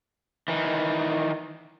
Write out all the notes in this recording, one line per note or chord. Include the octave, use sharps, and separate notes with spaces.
D#3 E3